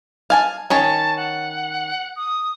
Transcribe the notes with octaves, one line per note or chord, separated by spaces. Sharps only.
F5 G#5 A5
D#3 C#4 C#5 A5
F#5
D#6